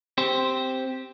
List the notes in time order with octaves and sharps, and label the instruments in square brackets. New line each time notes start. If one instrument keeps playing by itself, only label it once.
[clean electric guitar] C4 G4 C5